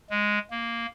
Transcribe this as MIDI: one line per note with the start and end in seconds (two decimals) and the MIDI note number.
0.10 0.39 56
0.51 0.86 58